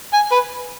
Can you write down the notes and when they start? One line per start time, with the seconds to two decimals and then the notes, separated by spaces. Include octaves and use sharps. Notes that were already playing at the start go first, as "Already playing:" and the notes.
0.13 G#5
0.32 B4